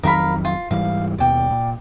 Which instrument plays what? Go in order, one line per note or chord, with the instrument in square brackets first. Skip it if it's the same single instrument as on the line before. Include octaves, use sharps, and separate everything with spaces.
[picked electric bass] F2 D#3 F#3 [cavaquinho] A#4 F5 B5
[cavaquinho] F4
[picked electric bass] G#2 E3 G3 [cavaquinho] F5
[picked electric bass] D#2 B2 [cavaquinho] D5 G5
[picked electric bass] A#2